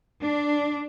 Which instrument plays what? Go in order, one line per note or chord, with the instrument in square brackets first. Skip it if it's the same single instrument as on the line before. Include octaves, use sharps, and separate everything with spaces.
[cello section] D4